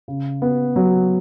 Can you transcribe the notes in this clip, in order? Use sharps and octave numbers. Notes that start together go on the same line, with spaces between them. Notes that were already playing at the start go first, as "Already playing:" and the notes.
C#3
B3
F#3